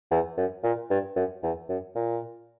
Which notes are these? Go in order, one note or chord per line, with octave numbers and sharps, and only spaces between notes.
E2
F#2
A#2
G2
F#2
E2
F#2
A#2